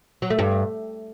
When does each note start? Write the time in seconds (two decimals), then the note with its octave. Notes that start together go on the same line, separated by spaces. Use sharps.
0.22 F#3
0.30 A3
0.39 G2